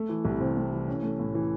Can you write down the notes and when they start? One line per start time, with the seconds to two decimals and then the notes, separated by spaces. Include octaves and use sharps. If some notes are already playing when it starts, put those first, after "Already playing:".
Already playing: A3
0.09 E3
0.25 C2
0.40 C3
0.57 A3
0.72 E3
0.88 C#4
1.03 A3
1.20 A2
1.35 E3